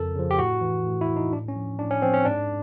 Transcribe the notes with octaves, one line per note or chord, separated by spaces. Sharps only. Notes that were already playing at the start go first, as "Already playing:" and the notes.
Already playing: F2 C#3 F3 A4 A#4
C#3 F3
G4
A2 F#4
E3
A2
E4
E3
D#4
A2 D4
C#4
F3
A2 D4
C#4
F3 C4
C#4
G#2 D4